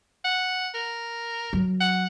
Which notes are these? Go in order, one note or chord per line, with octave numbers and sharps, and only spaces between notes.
F#5
A#4
F#3
F#5